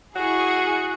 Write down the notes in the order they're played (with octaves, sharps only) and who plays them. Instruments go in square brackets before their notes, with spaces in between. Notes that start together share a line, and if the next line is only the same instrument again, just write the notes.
[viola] E4 C#6 [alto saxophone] F#4 [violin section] G#4